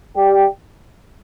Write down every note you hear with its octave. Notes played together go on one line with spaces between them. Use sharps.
G3 G4